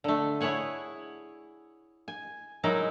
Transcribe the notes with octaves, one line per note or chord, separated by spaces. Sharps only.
D3 A3
E4 G#4 C#5 F#5 G#5
G#5
F#3 G#3 D#4 E4 A#4